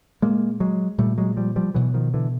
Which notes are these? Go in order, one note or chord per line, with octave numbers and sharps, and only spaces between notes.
A#2 G#3 A#3
F#3 G#3
A#2 G3 A3
F#3 G#3
F3 G3
F3 G3
B2 E3 F#3
D#3 F3
D3 E3